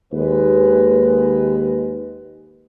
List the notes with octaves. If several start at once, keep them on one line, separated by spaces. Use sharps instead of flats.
D#2 G#3 B4